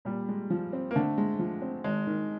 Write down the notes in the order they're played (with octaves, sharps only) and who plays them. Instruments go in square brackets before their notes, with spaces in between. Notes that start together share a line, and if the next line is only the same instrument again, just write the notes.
[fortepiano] A#2 [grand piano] G3
[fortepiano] G#3
F3
C4
[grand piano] A#3
[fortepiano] D3 [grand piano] A3
[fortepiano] G#3
F3
C4
[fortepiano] G#1 [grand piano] G#3
[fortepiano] D#3